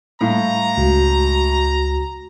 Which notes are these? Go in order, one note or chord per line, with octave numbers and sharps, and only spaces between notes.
A2 G3 F5 A#5
C#2 F#4